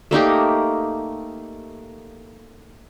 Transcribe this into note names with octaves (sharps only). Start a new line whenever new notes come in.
A3 A#3 D#4 G4